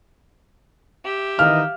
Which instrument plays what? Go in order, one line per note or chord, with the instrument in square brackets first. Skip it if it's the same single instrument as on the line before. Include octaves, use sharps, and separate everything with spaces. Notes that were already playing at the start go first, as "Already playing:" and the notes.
[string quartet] G4 E5
[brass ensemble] D#3 E3 D#4 [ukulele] F5 [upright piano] F6